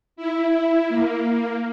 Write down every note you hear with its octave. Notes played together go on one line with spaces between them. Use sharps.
E4
A#3